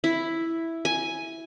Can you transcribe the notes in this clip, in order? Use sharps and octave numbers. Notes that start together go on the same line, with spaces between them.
E4
G#5